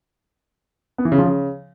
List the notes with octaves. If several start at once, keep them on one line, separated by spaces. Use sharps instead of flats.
B3
E3
C#3
F3
C#3